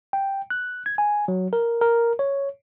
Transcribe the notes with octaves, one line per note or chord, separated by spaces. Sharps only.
G5
F#6
G#6
G#5
F#3
A#4
A#4
C#5